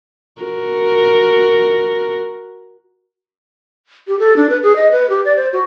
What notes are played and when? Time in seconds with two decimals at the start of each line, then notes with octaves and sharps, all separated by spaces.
0.42 F#4 A#4
4.08 G4
4.19 A4
4.37 D4
4.50 B4
4.63 G#4
4.76 D#5
4.92 B4
5.10 G4
5.25 D5
5.37 C5
5.53 F#4